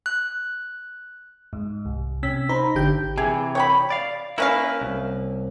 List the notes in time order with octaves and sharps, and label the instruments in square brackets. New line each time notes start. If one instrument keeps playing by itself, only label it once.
[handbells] F#6
[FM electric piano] G#2
C2
C3 C#4 E6 B6
D#4 C5 A#5 B5
G#1 D3 G4 G6
[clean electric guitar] C3 E3 [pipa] G#4
[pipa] C#5 G5 B5
[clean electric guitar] D5 F5
[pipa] A#3 C#4 F5 [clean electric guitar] E4 A#4 B4
[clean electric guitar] C2